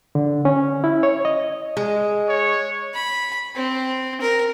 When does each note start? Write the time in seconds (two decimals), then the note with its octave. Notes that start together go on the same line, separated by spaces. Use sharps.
0.15 D3
0.45 C#4
0.84 E4
1.03 C#5
1.25 D#5
1.77 G#3
2.29 C#5
2.94 B5
3.56 C4
4.21 A#4